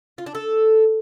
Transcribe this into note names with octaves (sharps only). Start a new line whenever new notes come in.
F4
D4
A4